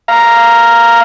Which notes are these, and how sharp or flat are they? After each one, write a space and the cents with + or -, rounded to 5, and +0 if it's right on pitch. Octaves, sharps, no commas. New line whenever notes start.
F5 -10 A#5 +0